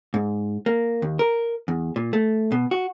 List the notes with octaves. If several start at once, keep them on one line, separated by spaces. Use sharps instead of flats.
G#2
A#3
D#2
A#4
E2
A#2
A3
B2
F#4